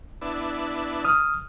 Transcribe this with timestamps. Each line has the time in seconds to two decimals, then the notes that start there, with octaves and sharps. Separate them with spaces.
0.22 B3 D4 E4
1.05 D#6 F6